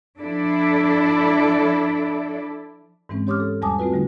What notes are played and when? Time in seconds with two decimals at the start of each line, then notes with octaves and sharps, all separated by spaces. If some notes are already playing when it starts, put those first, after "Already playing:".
0.19 F3 D4 E4 A4 D5
3.09 G#2 E3 G#3 C4 C#4
3.27 G4 C#5 C6 D6 D#6 F6
3.40 A4
3.62 E2 G3 G#5 A5 D6 D#6
3.79 A3 C4 F4 F#4 B4
3.92 D3 G3 A3 D#4